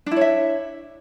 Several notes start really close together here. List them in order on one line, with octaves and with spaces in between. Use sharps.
D4 E4 C#5 E5